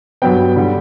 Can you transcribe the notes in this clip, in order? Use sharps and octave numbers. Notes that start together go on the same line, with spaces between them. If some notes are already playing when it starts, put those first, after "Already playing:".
G2 F#3 B3 G5
D3 G3